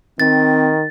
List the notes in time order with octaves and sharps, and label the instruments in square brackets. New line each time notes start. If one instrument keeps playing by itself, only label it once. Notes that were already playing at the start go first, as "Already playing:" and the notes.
[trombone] D#3 [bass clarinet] C4 [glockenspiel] A6